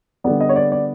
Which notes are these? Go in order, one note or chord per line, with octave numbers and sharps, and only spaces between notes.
D3 G3 B3 D5
D#5
C#5
D5
D5